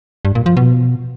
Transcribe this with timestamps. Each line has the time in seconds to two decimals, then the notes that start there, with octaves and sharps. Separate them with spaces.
0.25 G2
0.35 A#2
0.46 F3
0.57 B2